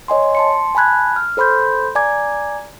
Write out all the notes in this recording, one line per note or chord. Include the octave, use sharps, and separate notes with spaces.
C#5 D#5 G#5 C6
A5 C6 C#7
G#5 A5 B5 F#6 G#6
F6
A4 C5 B5 C6 G6
D5 G#5 A#5 D6 G#6